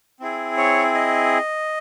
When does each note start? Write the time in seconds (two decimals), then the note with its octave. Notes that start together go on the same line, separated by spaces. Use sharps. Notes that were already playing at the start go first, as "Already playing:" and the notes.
0.20 C4 E4 G#4
0.57 C#5
0.95 D#5